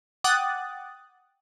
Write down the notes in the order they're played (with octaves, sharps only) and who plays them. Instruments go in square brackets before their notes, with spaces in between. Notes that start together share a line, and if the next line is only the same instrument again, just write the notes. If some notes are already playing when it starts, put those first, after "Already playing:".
[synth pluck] F#5 G5 D6 D#6 F#6 A6